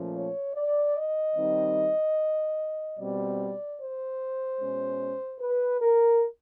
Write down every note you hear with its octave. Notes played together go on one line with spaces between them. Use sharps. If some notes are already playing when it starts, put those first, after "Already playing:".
Already playing: A#2 F3 A3 C#4
C#5
D5
D#5
D#3 G3 C4 D#4
B2 G3 C4 D5
C5
B2 G#3 C#4
B4
A#4